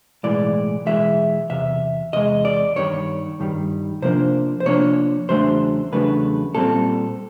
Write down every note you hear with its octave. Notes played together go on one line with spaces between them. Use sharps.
B1 A2 E3 G#3 D5
B1 A2 E3 G#3 E5
E2 C3 E5
E2 C3 G#3 D#5
D5
G2 D#3 G3 C#5
G2 D#3 G3
C3 F3 A#3 D4 C5
C5
C3 F3 A#3 D4 C#5
E2 C#3 F#3 A3 D4 C5
E2 C#3 F#3 A3 D4 B4
A#2 G3 C4 A4